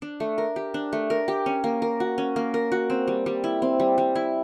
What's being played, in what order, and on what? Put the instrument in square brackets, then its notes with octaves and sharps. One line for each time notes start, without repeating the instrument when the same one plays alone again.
[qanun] D4
A3
A#4
G4
D4
A3
A#4
G4
C#4
A#3
A#4
F#4
C#4
A#3
A#4
F#4
C4
G3
G3
E4
C4
G3
G3
E4